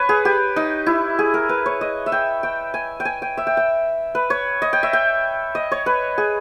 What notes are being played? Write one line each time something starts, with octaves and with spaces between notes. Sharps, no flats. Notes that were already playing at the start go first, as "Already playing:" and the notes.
Already playing: B4 C#5
G#4
G4
D#4
E4
G#4
A#4
B4
C#5
D#5
E5
G5
G5
G#5
G5
G#5
G5
E5
G5
G5
B4
C#5
D#5
G5
E5
G5
D#5
C#5
B4
G#4